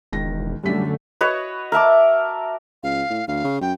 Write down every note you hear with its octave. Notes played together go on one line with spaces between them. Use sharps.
E1 C#2 D#3 A#6
F#2 D3 G3 A3 C#4 B6
F#4 B4 C#5 D#5
A#4 E5 A5 D6
C#2 F5
A2
D2 F5
C#3
F#2 G5